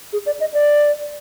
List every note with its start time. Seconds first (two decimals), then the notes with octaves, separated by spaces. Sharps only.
0.13 G#4
0.26 D5
0.40 D#5
0.54 D5